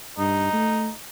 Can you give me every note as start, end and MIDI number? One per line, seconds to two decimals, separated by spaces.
0.18 0.48 43
0.18 0.94 63
0.53 0.89 57